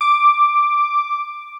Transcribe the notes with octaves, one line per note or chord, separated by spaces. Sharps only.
D6